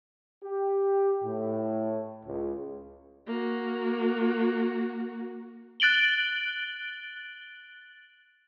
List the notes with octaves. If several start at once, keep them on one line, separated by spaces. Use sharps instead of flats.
G4
A2
C#2
A#3 F#4
F#6 A6 D7 F#7 G7